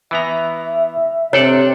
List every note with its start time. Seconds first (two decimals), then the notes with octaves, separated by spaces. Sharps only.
0.11 E3 B3 E5 A#5
1.33 C3 D4 A4 C#5 D5